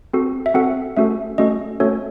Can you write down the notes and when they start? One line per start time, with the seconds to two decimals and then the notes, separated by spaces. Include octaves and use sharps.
0.13 C4 F#4 A4
0.46 E5
0.54 C4 F#4 A4 F#5
0.97 A3 C#4 F#4 A4 E5
1.38 A3 C#4 F#4 A4 D#5
1.80 A3 C#4 F#4 A4 C#5